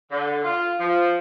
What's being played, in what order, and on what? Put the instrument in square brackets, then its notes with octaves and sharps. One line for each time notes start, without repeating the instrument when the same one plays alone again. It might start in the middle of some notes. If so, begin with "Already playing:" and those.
[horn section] D3
F4
F3